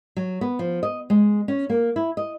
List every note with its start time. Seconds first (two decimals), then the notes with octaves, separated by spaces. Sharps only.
0.17 F#3
0.41 B3
0.59 F3
0.83 D#5
1.10 G#3
1.48 C#4
1.70 A#3
1.96 E4
2.17 D#5